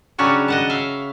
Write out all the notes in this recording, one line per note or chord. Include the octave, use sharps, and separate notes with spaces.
C#3 F#3 G3 C#4 D4 C#5
D#5 F#5 A5
E5 F5